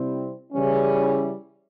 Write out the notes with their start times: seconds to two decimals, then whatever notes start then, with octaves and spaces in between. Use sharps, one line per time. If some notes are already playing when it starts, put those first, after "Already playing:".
Already playing: C3 G3 C4 E4
0.53 C#3 E3 G3 C#4